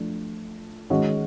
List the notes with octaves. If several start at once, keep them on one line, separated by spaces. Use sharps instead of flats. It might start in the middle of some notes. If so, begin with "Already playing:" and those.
Already playing: F3 A3 D4
D#3 G#3 C#4 F#4